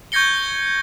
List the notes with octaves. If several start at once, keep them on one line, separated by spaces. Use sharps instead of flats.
C#6 G6 G#6 A#6 C#7 G7